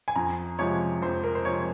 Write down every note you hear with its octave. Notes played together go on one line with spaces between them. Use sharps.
G#5
F2 A#5
C3 F3 G#3 C#5
F2 C5
A#4
C5
C3 F3 G#3 C#5